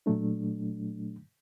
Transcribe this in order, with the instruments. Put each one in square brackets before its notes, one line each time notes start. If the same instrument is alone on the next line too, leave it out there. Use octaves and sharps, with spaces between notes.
[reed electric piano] A#2 F#3 A3 D4